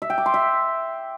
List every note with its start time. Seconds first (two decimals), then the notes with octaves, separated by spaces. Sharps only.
0.02 E5
0.10 G5
0.18 D6
0.26 C6
0.34 E5